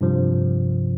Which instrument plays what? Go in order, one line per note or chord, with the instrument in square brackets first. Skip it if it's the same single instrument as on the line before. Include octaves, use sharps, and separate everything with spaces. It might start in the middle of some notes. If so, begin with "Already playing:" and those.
[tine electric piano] G2 C3 F3